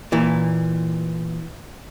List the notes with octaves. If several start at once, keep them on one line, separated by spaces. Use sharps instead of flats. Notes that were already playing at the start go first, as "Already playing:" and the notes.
A#2 E3